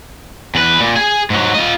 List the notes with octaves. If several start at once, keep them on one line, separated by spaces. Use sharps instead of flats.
E2 B4
A#2
G#4 G#5
G#2 F#3
F4 D#5